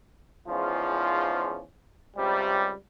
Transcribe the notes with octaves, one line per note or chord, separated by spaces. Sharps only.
E2 G#2 F3 C#4 F4
C#2 C3 G3